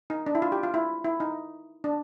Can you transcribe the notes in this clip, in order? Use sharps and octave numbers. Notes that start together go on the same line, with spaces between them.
D#4
D4
E4
F4
G4
F4
E4
E4
D#4
D4